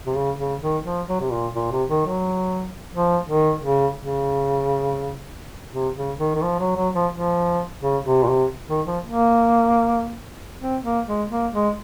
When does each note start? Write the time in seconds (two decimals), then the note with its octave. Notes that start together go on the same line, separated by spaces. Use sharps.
0.07 C3
0.15 C#3
0.39 C#3
0.62 D#3
0.85 F3
1.09 F#3
1.21 C3
1.32 A#2
1.55 A#2
1.72 C3
1.90 D#3
2.07 F#3
2.94 F3
3.28 D#3
3.63 C#3
3.99 C#3
5.73 C3
5.96 C#3
6.19 D#3
6.35 D#3
6.43 F3
6.60 F#3
6.77 F#3
6.95 F3
7.12 F3
7.82 C#3
8.05 C3
8.24 A#2
8.28 C3
8.69 D#3
8.87 F3
9.04 A#3
10.61 C4
10.84 A#3
11.07 G#3
11.31 A#3
11.53 G#3